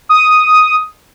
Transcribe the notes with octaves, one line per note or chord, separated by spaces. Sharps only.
D#6